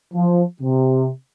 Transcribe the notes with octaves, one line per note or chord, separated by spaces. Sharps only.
F3
C3